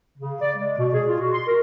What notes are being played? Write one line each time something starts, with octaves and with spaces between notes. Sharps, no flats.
C#3
D5
G#3
B2
G#4
F4
F#4
C6
A#4